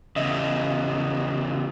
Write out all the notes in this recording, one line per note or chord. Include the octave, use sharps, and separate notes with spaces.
E2 C#3 D#5 E5